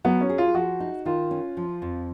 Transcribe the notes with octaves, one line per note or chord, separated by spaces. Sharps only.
F#3 B3
C#4
G#4
F4
F3 F#4
D#4
D#3 F4
C#4
F3
F2